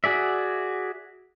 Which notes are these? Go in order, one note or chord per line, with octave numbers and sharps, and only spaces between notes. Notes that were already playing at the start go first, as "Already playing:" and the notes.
F#4 G#4 D5 E5